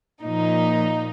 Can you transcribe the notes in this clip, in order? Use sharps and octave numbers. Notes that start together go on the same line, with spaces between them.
A#2 F3 D#4